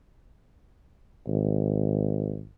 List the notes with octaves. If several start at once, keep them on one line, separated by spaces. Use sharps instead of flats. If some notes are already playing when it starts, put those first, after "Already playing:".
G#1